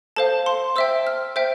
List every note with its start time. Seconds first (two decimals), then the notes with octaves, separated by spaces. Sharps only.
0.16 A4 C5 F5 A5
0.46 C6
0.76 C5 E5 G5 E6
1.07 F6
1.36 C5 E5 G5 G6